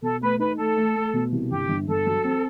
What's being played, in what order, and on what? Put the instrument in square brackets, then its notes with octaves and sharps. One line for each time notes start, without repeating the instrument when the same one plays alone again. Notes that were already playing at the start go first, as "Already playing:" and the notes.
[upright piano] B2 [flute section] A4
[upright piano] A3 [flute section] B4
[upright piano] D#4 [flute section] B4
[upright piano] A3 [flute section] A4
[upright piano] A3
A3
B2
C2
[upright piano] G1 [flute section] G4
[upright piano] G1
[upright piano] G1 [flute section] A4
[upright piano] F#3
C4